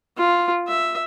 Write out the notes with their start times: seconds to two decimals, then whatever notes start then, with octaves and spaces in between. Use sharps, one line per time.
0.18 F4
0.68 E5